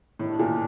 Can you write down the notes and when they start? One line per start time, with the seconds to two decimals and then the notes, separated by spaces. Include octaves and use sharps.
0.19 A2 D#3 G3 D4
0.39 A#2